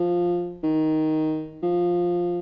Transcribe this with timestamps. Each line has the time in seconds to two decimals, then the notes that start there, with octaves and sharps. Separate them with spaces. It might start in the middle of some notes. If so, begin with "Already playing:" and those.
Already playing: F3
0.63 D#3
1.63 F3